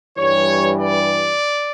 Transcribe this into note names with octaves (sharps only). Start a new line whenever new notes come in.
G2 E3 G3 C#5
D5